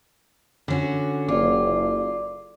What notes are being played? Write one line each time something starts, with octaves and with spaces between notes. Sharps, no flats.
D3 C#4 F#4
F#1 F4 D5 D6